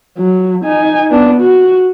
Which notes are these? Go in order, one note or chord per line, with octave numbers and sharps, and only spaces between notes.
F#3
D#4 G#5
B3 D4
F#4